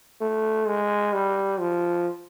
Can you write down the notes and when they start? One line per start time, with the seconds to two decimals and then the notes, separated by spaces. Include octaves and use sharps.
0.21 A3
0.67 G#3
1.13 G3
1.60 F3